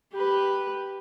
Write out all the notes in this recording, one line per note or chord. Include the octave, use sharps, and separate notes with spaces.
G4 B4